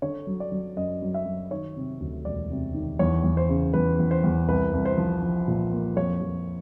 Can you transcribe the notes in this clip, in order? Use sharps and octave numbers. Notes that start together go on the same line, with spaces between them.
D3 C#5
F#3
D5
F#3
F#2 D#5
F#3
E5
F#3
D#3 C#5
C3
D2
E1 D5
C3
D#3
E2 C#5
E2
C5
C#3
E2 B4
E2
C5
E2
C2 B4
C2
C5
F3
F3
A#2
A#3
F2 C#5
F2